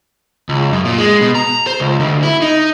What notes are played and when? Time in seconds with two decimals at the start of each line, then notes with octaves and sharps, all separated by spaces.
0.49 C#2
0.73 F#2
0.85 A#2
0.98 G#3
1.21 B2
1.35 A#5
1.67 C5
1.80 C#2
2.00 D2
2.23 E4
2.42 D#4